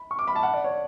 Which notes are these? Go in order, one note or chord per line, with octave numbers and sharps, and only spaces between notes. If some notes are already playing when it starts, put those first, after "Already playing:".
Already playing: B5
C#6
D6
B5
A5
F#5
D5
C#5